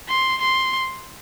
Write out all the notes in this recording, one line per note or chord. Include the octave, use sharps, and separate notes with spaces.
C6
C6